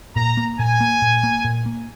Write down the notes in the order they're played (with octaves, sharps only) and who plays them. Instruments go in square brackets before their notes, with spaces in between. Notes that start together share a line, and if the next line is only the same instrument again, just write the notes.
[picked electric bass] A#2 [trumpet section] A#5
[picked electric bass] A#3
[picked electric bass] A#2 [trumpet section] G#5
[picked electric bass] A#3
A#2
A#3
A#2
A#3